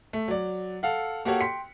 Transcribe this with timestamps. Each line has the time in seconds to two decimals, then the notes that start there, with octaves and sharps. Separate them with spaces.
0.13 A3
0.28 F#3 D5
0.83 A4 F5 F#5
1.25 A#3 F#4 G4 A4 C#5 F#5
1.41 G5 C6 B6 C#7